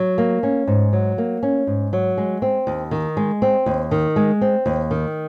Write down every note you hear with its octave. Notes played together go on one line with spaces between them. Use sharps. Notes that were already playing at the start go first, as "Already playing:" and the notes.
Already playing: F#3
A#3
C#4
G#2
F#3
A#3
C#4
G#2
F#3
G#3
C4
D#2
D#3
G#3
C4
D#2
D#3
G#3
C4
D#2
D#3